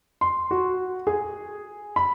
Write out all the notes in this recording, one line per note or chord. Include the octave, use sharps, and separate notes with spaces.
C6
F#4
G#4
B5